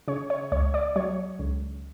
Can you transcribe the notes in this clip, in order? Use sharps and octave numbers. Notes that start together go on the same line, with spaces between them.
C#3 C#5
C#5
C#2 C#5
D5
F#3 C#5
C#2